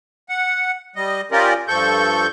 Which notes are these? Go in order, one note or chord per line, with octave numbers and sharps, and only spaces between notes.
F#5
G3 D#5
C#4 F4 G4 A#4 D5 D#5
G2 F3 A4 C#6 G6